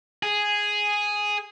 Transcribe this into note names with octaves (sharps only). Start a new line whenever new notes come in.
G#4